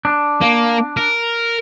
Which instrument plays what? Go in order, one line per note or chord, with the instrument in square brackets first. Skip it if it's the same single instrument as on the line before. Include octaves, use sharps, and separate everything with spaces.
[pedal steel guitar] D4
[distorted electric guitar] A#3
A#4